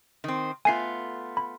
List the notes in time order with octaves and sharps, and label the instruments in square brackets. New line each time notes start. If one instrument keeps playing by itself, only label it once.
[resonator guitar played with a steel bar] D#3 C4
[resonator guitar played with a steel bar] A3 B3 F4 [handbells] G#5 C7
[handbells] B5